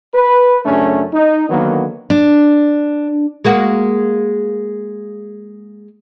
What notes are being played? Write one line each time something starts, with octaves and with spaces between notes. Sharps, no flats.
B4
F#2 C#3 A3 C#4 D4
D#4
D3 D#3 F#3 A#3 B3
D4
G#3 A#3 F#4